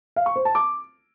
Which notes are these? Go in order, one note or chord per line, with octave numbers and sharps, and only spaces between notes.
F5
C#6
C5
A5
D6